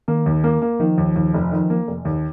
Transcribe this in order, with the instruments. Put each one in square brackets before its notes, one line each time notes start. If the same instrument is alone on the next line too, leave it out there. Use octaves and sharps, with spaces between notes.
[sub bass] D#3 [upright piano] A#3
[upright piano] D#2
A#3
A#3
[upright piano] D#3 [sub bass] F3
[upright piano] D#2
D#2
F1
D#3
A#3
F1
D#2